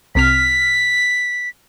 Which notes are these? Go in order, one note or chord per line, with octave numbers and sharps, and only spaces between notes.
C2 C3 F6 B6